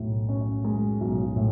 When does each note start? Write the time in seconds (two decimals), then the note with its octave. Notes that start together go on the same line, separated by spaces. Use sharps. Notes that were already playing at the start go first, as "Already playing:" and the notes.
Already playing: B1 A2
0.29 C#4
0.64 G#3
1.01 B1
1.36 A2